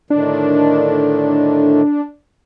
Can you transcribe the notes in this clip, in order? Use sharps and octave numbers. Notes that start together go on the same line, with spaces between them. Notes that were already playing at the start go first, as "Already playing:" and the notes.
A2 D3 D#3 D4